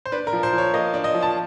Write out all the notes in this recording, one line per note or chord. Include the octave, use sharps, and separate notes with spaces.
C5
D4 B4
A#4
F3
C5
F3
C#5
A#3 D#5
D4
D#5
F3
A5